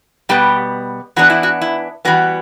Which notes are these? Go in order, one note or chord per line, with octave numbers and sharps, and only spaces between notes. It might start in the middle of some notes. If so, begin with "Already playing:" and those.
B2 G3 B3 G4
E3 B3 D4 F#4
E4
F#4
E4
E3 G3 B3 F#4